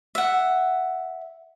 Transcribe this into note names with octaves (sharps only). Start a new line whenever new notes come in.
E5 F#5